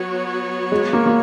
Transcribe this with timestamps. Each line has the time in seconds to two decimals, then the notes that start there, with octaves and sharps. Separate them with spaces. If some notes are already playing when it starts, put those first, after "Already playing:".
Already playing: F#3 B3 F#4 C#5
0.72 G#3
0.93 A#3
1.06 A#3